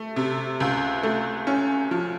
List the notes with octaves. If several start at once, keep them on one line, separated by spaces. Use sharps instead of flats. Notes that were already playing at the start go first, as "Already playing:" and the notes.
Already playing: A3
C3
C#2
A3
C#4
F3